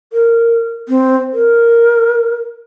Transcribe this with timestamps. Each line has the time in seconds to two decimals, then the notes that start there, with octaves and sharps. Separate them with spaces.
0.13 A#4
0.89 C4
1.33 A#4